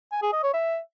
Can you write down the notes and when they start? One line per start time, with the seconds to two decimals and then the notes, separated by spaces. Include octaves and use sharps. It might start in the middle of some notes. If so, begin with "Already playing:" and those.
0.12 G#5
0.22 G#4
0.33 D#5
0.43 C#5
0.54 E5